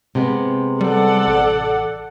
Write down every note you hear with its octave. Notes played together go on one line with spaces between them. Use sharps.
C3 G#3 B3
G3 A4 D5 F#5
A1